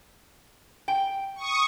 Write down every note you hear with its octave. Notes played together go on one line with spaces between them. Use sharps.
G5
C#6 D#6